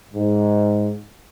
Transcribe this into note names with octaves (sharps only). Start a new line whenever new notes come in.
G#2